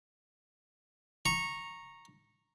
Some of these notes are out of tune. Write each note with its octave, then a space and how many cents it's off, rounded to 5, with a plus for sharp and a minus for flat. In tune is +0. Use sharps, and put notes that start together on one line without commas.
A#5 +0 C#6 -15